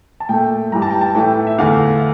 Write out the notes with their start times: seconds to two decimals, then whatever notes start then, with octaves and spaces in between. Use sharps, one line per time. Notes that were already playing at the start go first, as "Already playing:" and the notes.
0.20 A5
0.29 A#2 A3 G5
0.72 G2 E3 G3 A#5
0.82 A5
0.91 G5
1.01 A5
1.15 A2 E3 A3 G5
1.47 E5
1.58 E2 D3 A3 F5